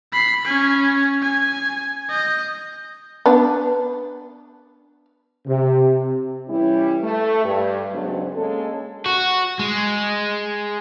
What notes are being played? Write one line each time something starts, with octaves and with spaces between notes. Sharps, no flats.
B5 C7
C#4 G#5
G#5
D#5 G6
B3 D4
C3
E3 G3 C#4 E4
A3
G2
G#2 C#3 F#3 B3 C4 D4
G#3 A#3 C#4 A4
F#4
G#3